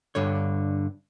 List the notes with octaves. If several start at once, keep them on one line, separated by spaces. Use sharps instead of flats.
G2 D3 C#5